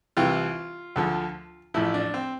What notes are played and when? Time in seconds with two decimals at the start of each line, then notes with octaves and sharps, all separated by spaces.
0.17 C2 C3 E3 F4
0.96 D2 D3 F3
1.74 A1 A2 F3 E4
1.94 D4
2.14 C4